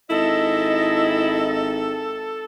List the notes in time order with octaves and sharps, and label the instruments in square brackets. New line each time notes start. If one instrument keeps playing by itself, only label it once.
[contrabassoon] G#1 [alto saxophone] E4 [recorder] A4 [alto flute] D#5